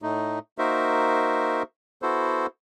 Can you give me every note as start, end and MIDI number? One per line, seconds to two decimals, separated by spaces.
0.02 0.39 45
0.02 0.39 57
0.02 0.39 63
0.58 1.63 58
0.58 1.63 63
0.58 1.63 66
0.58 1.63 70
0.58 1.63 72
0.58 1.63 76
2.02 2.47 59
2.02 2.47 64
2.02 2.47 66
2.02 2.47 69
2.02 2.47 72